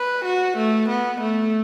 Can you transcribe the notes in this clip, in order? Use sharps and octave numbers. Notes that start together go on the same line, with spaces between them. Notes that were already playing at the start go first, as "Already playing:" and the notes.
Already playing: B4
F#4
A3
B3
A3